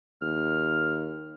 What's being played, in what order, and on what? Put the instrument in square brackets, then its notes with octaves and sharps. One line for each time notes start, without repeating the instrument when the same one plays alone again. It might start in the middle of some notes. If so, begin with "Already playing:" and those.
[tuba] D#2 [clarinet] F6